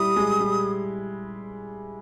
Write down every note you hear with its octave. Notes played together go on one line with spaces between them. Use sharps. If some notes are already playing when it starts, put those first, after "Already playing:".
Already playing: G3 E4 D#6
G#3
G3